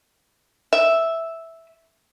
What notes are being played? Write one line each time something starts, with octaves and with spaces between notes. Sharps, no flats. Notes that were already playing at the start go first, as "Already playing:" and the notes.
E5